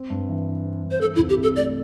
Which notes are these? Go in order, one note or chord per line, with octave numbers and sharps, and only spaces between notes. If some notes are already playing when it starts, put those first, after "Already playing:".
Already playing: C4
G2
E3
E4
C4
G2
C5
E3 A4
E4
C2
G4
C3
A4
A3 D5